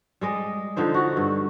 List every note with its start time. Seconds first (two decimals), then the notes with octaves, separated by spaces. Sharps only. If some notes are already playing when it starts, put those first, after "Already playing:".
0.21 G3 G#3 D#5
0.76 D3 F3 D#4 C5
0.94 F#4
1.17 G2